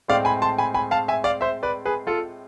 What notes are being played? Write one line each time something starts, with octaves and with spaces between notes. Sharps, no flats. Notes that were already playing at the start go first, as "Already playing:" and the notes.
A2 G#3 C4 D5 F5
G#5 B5
A5 C6
G#5 B5
G#5 B5
F5 A5
E5 G#5
D5 F5
C5 E5
B4 D5
G#4 B4
F4 A4